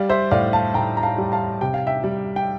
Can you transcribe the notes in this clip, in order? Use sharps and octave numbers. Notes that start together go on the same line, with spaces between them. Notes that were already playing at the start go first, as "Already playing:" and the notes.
Already playing: G3 D5 F5
C5 E5
A2 D5 F5
F5 A5
A2 G5 A#5
A#5
F5 A5
G3
F5 A5
C3 G5
F5
E5 G5
G3
G5